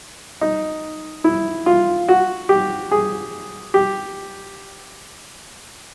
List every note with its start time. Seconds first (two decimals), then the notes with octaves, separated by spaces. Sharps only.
0.41 D#4
1.24 E4
1.66 F4
2.08 F#4
2.49 G4
2.91 G#4
3.74 G4